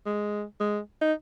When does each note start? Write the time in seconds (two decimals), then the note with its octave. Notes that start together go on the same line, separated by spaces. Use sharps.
0.06 G#3
0.60 G#3
1.02 D#4